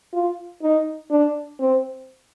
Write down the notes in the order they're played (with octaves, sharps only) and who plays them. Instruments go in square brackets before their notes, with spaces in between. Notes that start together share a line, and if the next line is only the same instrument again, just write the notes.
[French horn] F4
D#4
D4
C4